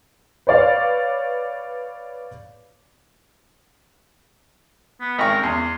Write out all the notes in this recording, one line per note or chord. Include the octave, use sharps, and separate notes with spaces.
B4 C#5 D5 F5
B3
G#1 A#4 G5 C#6
E2 C6